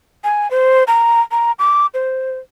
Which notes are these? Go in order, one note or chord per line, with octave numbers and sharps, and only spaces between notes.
G#5
C5
A#5
A#5
D6
C5